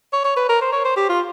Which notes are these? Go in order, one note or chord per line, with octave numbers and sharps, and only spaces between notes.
C#5
C#5
B4
A#4
C5
C#5
C5
G4
F4